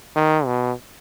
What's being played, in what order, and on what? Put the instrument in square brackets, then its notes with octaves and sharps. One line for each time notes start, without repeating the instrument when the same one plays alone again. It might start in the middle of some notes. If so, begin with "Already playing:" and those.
[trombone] D#3
B2